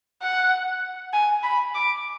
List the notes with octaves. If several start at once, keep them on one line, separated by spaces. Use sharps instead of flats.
F#5
G#5
B5
D6